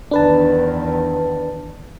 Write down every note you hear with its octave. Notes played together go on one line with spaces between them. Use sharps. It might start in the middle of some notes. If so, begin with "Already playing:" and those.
E2 D#3 D4 B4 A5